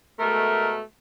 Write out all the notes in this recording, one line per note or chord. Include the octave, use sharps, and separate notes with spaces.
B2 G#3 A3 A#4